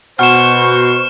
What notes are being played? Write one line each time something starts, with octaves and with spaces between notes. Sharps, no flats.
B2 C5 F#5 C#6 F6 E7